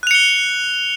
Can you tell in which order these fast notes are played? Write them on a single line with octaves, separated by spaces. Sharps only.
F#6 F7 C#7 G7